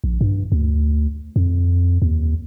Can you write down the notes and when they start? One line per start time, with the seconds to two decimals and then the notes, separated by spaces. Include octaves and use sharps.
0.04 A#1
0.21 G2
0.52 D2
1.36 F2
2.02 D#2